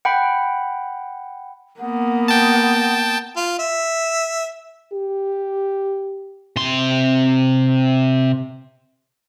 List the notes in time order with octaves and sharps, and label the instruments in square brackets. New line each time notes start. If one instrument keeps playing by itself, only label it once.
[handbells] F#5 G5 B5
[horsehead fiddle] A#3 B3 [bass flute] F#5
[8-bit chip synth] G5 A5
[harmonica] F4
E5
[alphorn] G4
[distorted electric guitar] C3 C6